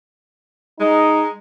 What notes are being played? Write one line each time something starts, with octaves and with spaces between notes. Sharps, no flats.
G#3 D#4